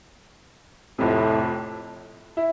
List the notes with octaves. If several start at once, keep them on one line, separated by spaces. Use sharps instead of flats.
F1 F2 A2 C3
E4